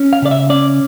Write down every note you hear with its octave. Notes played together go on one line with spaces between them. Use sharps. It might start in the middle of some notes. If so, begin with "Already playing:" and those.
Already playing: C#4
F5
C#3 D5
E5
C#4 D5